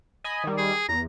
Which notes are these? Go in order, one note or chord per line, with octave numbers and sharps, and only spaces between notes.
D#5 G#5 B5
D#3 G3
G#4
E2 A#5